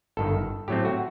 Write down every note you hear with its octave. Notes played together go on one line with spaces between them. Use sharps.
G1 G2 D#3 A4
A2 F#3 A3 C4 G4
F#4